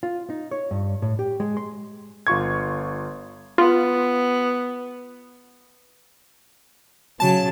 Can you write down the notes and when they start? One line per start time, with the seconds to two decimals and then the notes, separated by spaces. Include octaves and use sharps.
0.03 F4
0.30 D#4
0.51 C#5
0.71 G2
1.02 A2
1.19 G4
1.40 G#3
1.57 C6
2.27 G1 F4 C#6 G#6
3.58 B3 F4
7.20 C#3 F#3 A5